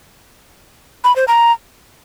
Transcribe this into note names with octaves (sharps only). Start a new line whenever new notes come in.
B5
C5
A#5